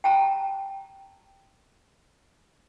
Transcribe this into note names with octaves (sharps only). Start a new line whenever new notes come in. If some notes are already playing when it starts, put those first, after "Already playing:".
G5 A5 A#5